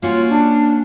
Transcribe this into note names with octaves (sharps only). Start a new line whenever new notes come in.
A#3 C#4 F4 F#4
D4